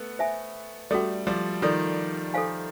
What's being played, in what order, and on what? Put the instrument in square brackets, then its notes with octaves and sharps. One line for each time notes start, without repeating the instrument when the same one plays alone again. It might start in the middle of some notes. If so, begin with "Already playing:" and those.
Already playing: [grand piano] A3 B3
[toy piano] C5 E5 G#5
[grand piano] G3 A3 [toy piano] C#4 F#4 A4 D5
[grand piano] F3 G3
[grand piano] D#3 F3 [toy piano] F4 A4 D5
[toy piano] A4 C5 F5 G#5